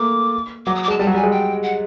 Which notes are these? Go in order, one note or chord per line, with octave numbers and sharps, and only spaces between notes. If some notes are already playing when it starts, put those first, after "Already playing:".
Already playing: A3 A#3 D6
F#3 D6
D#6
D6
G#3 A5
G3 A5
F#3
G3 G#5
G#3
G5
F#5